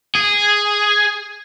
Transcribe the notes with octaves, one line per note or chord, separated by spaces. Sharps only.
G#4